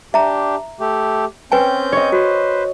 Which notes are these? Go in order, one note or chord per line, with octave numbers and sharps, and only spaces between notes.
D4 G4 E5 A#5
A3 G4
C4 C#4 B4 G5 G#5 G6
C#5 D#5
F#4 B4 C5